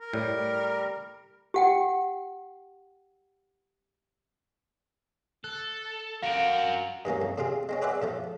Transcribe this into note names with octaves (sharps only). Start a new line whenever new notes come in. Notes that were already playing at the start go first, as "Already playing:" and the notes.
A#4
A2 G3
G4 F#5 G5
A4 F#6
F#4 A#4 F5 D7
G2 E3 A#3 C#4
F2
A2 C3 C4 F4 G#4
G#3 C4 C#4
G#4 B4 C5 D5 E5 F#5
A2 F3 A3